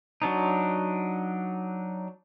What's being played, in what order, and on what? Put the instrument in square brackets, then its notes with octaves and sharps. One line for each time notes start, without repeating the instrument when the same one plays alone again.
[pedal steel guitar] F#3 D4 D#4